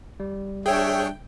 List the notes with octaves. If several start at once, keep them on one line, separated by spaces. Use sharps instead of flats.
G3
D4 G#4 C#5 E5 G5